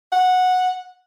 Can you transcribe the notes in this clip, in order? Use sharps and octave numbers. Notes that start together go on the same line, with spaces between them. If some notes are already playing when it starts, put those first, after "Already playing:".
F#5